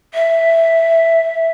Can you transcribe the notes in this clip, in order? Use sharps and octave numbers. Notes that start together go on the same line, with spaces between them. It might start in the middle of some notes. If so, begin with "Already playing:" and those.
E5